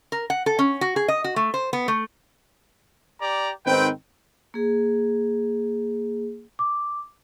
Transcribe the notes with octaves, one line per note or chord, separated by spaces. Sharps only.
A#4
F#5
A4
C#4
F#4
G#4
D#5
F#4
A3
C5
B3
A3
G4 D5 A#5
G#2 D#3 C4 B4 G5
A#3 G#4
D6